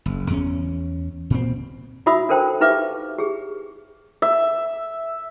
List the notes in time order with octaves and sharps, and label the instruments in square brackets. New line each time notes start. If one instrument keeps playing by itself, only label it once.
[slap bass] F#1
E2 C#4
A#2 C4
[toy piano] D#4 F#4 E5 B5 D#6 E6
D4 A4 A#4 C5 G5 A5
D#4 G4 B4 E5 F5 D6
G4 G#4
[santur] E5